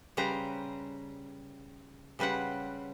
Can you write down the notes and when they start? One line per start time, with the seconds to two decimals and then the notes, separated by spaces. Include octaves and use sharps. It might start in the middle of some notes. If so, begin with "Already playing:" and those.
0.17 C#3 G3 B4 C5 A#5
2.19 C#3 G3 B4 C5 F#5